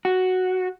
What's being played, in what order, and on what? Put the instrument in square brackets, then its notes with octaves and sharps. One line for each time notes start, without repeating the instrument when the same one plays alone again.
[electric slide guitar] F#4